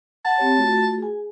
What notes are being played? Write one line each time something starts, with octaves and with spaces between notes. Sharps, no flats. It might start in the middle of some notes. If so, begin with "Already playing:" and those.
F#5 A5
C4 G4 C#5
A3 F4 F#4
G#4 G#5